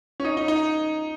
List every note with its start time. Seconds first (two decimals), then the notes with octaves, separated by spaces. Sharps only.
0.20 C#4
0.25 D#4
0.37 D#4
0.48 D#4